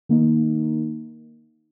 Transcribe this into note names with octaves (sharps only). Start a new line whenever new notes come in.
D#3 A#3 D#4